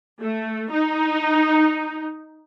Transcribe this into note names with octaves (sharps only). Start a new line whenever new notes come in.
A3
D#4